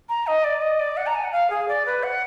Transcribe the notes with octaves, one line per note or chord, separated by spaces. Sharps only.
A#5
D#5
D5
D#5
D5
F#5
A#5
G#5
F#5
F5
G#4
D5
B4
F#5